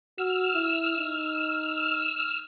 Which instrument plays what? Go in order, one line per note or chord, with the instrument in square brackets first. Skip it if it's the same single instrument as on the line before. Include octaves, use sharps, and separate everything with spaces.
[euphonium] F#4 [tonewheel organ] E6 F6
[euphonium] E4
D#4